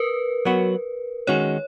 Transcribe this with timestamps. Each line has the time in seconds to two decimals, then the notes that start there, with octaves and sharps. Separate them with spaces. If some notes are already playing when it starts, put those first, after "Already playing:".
Already playing: A#4 B4
0.45 F#3 B3 F#4
1.27 D#3 G#3 C#4 F#4 C#5